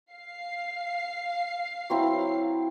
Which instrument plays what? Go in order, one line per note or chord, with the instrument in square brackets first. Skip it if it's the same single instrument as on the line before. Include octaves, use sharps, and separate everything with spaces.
[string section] F5 C7
[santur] F#3 C4 E4